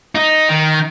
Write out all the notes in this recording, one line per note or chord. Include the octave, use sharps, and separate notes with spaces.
D#4
D#3